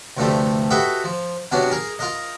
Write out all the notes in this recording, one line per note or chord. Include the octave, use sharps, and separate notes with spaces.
D2 G2 C3 F3 G3 A3
F#4 G4 A4 B4 D#5 E5
F3
C3 F#3 B3 C#4 D4
G#4 A#4
F4 A#4 D#5